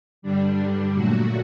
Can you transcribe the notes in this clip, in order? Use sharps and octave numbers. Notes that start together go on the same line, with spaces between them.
G2 D3 G3 D4
A#2 F#3 A3 F#4